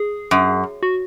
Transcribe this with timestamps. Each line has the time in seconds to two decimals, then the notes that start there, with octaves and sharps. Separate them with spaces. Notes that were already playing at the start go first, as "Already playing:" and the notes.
Already playing: G#4
0.31 F#2
0.83 F#4